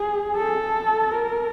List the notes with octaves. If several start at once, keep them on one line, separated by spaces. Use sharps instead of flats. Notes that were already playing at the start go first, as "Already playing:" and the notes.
Already playing: G#4
A4
A#4